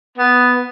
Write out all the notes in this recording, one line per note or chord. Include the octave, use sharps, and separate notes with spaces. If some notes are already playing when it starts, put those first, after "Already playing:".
B3